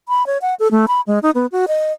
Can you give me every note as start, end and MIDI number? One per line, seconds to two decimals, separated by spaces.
0.08 0.25 83
0.26 0.38 73
0.41 0.54 78
0.59 0.68 69
0.71 0.85 57
0.88 1.01 83
1.07 1.19 56
1.23 1.30 63
1.35 1.46 59
1.52 1.65 66
1.68 1.92 75